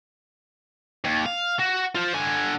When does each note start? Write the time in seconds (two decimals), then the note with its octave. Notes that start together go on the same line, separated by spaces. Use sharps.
1.05 D#2
1.26 F5
1.59 F#4
1.95 F4 C5
2.14 D3 G#5